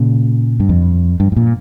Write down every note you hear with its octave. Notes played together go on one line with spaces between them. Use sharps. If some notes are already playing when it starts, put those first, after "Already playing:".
Already playing: A#2 C#3
G2
F2
G2
G#2
A#2